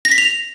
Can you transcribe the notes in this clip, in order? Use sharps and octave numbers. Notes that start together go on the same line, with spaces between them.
A#6
B6
F7